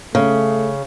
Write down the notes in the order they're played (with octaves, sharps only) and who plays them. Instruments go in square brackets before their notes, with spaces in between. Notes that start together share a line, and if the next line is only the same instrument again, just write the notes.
[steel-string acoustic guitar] C#3 [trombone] A3